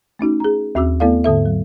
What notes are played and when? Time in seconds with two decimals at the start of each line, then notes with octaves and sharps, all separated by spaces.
0.19 A3 C#4 D#4 F#4
0.40 G#4 A#5
0.75 D#2 C4 F#4 D6 E6
1.00 A3 B3 E4 A4 D5 F5
1.24 G#2 D3 A4 E5
1.45 F#3